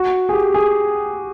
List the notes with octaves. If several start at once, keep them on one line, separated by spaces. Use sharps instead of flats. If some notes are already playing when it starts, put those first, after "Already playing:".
Already playing: F#4
G#4
G4
G#4